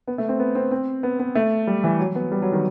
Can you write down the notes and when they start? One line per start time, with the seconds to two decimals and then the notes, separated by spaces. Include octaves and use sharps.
0.07 B3
0.18 A3
0.29 C4
0.39 B3
0.55 C4
0.71 C4
1.03 B3
1.19 B3
1.35 A3
1.67 G3
1.84 E3
1.99 F#3
2.15 B3
2.32 G3
2.42 F#3
2.53 D#3